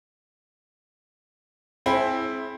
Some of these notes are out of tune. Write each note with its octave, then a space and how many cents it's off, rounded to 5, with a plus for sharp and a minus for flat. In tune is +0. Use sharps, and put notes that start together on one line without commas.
C4 +10 E4 +0 G#4 +35